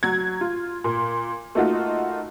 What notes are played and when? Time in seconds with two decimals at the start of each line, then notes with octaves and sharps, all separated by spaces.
0.03 F#3 G#6
0.41 F4
0.84 A#2
1.55 A3 A#3 D#4 F4 F#4